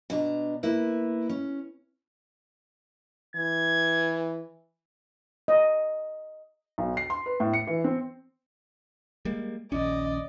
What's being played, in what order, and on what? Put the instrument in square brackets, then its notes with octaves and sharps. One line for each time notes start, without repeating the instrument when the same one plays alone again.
[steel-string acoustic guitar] B2 D4 A#5
A#3 E4 B4
C#4
[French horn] E3 [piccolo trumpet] G#6
[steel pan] D#5
[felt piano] B1
C7
C6
B4
A2
C#7
E3
C4
[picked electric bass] G3 G#3 A#3
[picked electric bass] A#1 D#2 C#4 [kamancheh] D5 D#5